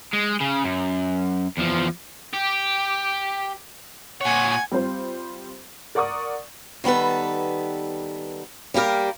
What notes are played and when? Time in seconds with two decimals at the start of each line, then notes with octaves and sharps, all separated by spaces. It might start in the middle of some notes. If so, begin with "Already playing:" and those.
0.13 G#3
0.41 C#3
0.65 F#2
1.57 E2 F3
2.33 G4
4.21 A#2 C#5 F#5 G#5
4.71 G3 C4 F4 C5
5.95 A#4 D5 F#5 C#6 D#6
6.84 D#3 G3 B3 A4 B4
8.74 G3 A#3 G4 A#4